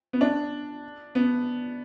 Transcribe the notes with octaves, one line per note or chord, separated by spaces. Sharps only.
B3
D4
B3